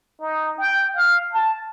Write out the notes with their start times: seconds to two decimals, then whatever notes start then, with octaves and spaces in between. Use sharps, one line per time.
0.20 D#4
0.58 G5
0.96 F5
1.32 A5